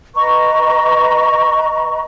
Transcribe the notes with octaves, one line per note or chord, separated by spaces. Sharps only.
B4 D#5 A#5 C#6